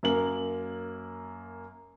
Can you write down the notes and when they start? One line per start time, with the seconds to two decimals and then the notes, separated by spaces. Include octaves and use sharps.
0.03 F#2 A#3 F#7